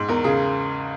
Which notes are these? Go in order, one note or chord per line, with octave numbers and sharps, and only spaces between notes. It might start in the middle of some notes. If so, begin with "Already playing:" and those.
Already playing: G#2
E2 A#4
C#3 G#4